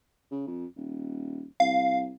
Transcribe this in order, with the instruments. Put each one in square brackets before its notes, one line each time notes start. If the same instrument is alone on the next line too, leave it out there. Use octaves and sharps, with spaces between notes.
[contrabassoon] C#3
F2
D#1
[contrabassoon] C2 [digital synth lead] F5